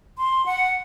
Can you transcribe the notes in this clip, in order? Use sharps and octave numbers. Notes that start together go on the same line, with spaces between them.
C6
F#5